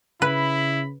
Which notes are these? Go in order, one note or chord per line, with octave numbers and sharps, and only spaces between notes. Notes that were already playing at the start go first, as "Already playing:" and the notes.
C#3 E4 B4 B5